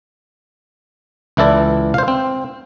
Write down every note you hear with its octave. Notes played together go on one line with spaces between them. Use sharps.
C#2 E3 E4 A4 D5
C5 F5
C4